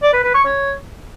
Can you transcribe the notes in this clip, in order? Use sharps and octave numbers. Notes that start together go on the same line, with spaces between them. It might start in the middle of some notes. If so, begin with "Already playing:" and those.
D5
B4
B4
C#6
C#5